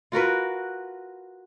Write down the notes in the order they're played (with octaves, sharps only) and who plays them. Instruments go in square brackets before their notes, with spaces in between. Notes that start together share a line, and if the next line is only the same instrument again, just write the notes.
[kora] F4 F#4 A#4 B4